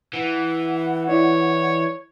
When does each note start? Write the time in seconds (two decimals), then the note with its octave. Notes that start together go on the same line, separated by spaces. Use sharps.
0.13 E3 F#5
1.08 E4 C#5 D5